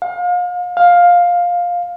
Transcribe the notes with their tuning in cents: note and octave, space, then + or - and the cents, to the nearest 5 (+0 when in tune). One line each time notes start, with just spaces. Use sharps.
F5 +35
F5 +10